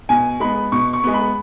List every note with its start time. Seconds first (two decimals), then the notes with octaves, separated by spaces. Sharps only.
0.09 B2 G#5
0.40 G#3 B3 B5
0.72 B2 C#6
0.93 C#6
1.04 G#3 B3
1.14 B5